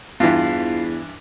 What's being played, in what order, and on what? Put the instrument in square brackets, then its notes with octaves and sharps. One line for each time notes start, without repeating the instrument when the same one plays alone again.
[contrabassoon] E2 [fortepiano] G2 E3 [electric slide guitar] F4